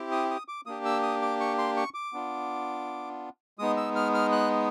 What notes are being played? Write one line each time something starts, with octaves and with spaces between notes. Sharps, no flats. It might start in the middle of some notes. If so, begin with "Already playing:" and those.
Already playing: C4 E4 G4
D#6
D#6
D6
A#3 D4 G4 D#6
E6
D#6
D6
C#6
C6
C#6
D6
B3 D4 F4
G#3 B3 D#4 D#6
E6
F6
F6
F#6